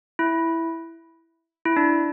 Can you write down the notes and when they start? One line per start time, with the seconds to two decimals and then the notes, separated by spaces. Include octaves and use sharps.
0.19 E4
1.65 E4
1.76 D4